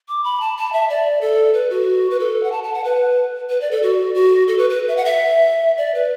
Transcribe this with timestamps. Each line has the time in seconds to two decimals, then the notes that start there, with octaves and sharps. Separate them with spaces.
0.08 D6
0.24 B5
0.41 A5
0.57 A5
0.73 E5
0.89 D5
1.21 A4
1.54 B4
1.70 F#4
2.10 B4
2.19 A4
2.43 F#5
2.52 A5
2.63 A5
2.74 F#5
2.84 B4
3.50 B4
3.61 D5
3.71 A4
3.83 F#4
4.14 F#4
4.48 A4
4.58 B4
4.70 B4
4.88 E5
4.97 F#5
5.05 E5
5.78 D5
5.95 B4